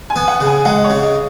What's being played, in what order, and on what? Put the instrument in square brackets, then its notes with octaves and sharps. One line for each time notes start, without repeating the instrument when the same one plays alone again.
[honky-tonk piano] G#5
[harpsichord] B3
[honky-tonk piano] F#5
[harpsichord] C#3
[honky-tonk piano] G#5
[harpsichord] G#3 [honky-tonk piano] F#5
[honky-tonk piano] D#5
C#5
[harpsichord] C#3
[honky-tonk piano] D#5